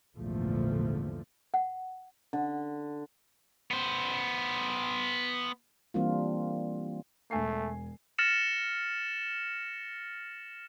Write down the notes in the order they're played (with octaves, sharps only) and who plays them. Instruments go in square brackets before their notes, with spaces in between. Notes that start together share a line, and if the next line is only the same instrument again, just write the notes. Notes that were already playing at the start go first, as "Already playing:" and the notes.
[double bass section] A#1 E2 G#2 D3 F3 A3
[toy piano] F#5
[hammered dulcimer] D3
[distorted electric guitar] B3 C5
[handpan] E3 G3 A#3 C4 D4 F4
[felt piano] E1 G#5 C7 [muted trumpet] A3
[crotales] F6 A6 A#6 C#7 E7 F#7